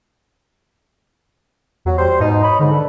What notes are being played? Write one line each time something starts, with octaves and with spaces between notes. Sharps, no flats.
E2 F#3
G3 C5
G#2 B2 D#4
C#5 D#5 B5
G#2 D3
D4 A4 B4